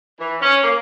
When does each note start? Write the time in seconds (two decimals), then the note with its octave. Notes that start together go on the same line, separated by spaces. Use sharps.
0.20 E3
0.41 C#4
0.63 A#3